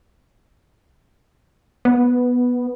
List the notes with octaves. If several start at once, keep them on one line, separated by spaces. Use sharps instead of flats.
B3